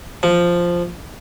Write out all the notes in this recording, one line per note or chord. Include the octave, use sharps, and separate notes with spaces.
F3